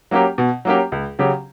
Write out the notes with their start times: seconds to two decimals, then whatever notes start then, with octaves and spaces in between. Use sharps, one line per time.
0.11 F#3 A#3 C#4 G4
0.38 B2
0.65 F#3 A#3 C#4 G4
0.92 C#2
1.19 C#3 F#3 C#4 G4